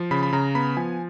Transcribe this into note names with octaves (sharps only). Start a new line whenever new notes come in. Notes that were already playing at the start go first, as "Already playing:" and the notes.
Already playing: F3
C#3 B5
B5
C#3 A#5
B3 B5
F3 G#5